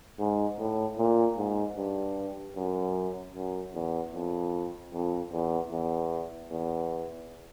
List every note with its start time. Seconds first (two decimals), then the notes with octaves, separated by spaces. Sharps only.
0.19 G#2
0.58 A2
0.98 A#2
1.37 G#2
1.77 G2
2.55 F#2
3.34 F#2
3.74 E2
4.13 F2
4.93 F2
5.32 E2
5.71 E2
6.51 E2